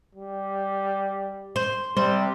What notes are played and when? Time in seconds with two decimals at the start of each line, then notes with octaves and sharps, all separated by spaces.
0.15 G3
1.56 C5
1.97 C3 G3 C5